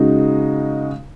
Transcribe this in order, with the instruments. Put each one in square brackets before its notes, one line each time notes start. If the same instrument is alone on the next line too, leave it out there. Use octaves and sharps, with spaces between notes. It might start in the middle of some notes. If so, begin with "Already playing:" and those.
Already playing: [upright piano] C#3 G#3 D#4 F#4